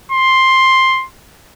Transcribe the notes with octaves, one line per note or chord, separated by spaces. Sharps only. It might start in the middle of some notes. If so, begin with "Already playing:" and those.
C6